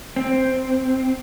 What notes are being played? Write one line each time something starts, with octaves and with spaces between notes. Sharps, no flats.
C4